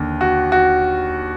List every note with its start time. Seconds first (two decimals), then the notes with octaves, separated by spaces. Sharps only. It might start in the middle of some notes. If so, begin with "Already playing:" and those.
Already playing: D#2 D3
0.21 F#4
0.52 F#4